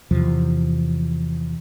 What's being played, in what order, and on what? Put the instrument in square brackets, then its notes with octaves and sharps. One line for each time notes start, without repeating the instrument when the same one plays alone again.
[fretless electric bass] E2 C3 F3